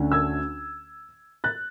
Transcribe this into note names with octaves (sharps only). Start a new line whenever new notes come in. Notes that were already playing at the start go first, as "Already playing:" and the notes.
Already playing: D2 D3 A3 C#4
E6 G#6
F#6 A6